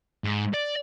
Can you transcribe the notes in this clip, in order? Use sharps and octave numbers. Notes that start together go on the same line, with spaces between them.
G#2
D5